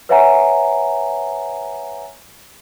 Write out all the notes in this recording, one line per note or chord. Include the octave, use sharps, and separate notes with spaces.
B4 C#5 E5 F#5 G#5 A#5